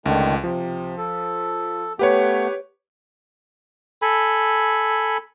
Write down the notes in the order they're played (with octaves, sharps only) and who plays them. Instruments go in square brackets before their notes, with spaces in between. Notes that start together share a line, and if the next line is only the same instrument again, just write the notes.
[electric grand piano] C#2 [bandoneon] D3 D#3 A3
[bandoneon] C3 [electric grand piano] F3
[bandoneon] A4
[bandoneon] A3 B3 [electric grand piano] G4 B4 C#5
[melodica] A4 G#5 B5